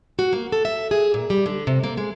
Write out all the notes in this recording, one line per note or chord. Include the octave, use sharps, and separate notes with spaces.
F#4
A#3
A4
E5
G#4
A#2
G3
D3
C3
A#3
G#3